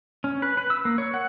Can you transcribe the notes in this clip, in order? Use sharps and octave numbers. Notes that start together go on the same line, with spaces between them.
C#4
B4
B4
E6
A#3
C#5
F#5